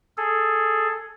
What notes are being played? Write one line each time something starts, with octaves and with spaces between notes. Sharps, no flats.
G#4 A4